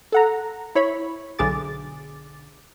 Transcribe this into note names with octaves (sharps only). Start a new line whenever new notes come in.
A4 F#5 A#5
E4 C#5 B5
B1 D3 G#4 D6 A6